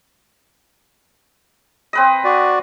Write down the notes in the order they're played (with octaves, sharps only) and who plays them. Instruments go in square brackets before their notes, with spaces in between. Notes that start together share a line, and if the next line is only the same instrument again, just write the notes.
[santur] C4 B4 D#5
[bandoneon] F#4 D5